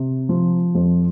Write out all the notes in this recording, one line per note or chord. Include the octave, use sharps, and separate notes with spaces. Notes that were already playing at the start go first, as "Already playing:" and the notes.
Already playing: C3
F3
F2